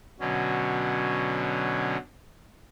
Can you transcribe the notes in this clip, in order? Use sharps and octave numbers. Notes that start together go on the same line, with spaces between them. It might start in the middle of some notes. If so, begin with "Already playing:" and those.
B2 D3 F#3 C#4